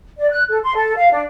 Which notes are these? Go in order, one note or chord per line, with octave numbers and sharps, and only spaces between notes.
D5
F#6
A4
C6
A4
F5
D4